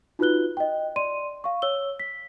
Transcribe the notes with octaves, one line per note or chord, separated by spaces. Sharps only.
D#4 F4 F#4 B4 F#6 G7
D#5 G5
D5 C6 D#7
F5 C#6
C#5 E6 G7
B6